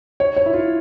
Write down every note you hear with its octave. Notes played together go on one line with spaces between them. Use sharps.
C#5
C#5
E4
F4